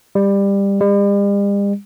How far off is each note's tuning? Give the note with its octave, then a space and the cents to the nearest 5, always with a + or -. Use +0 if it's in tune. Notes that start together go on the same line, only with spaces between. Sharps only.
G3 +20
G3 +45